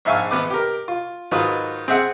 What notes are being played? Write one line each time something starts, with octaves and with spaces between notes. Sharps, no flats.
A#1 G#2 E5 F5 G#5 C#6
G#1 B3 B4 D6
G4 A#4
F4
G#2 D#3 F#3 F4 B4 D#6
C4 G#4 E5 F#5